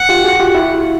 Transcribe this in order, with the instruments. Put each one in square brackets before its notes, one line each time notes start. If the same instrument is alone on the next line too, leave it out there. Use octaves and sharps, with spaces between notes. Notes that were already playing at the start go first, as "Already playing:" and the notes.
Already playing: [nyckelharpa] F#5
[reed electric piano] F4 G4
F#4 G#4
F4 G4
E4 F#4